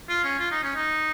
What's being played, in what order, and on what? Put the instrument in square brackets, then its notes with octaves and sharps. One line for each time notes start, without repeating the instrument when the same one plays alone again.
[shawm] F4
C#4
F4
D#4
C#4
D#4